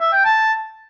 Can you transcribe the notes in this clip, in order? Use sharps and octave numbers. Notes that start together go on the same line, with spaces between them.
E5
G5
A5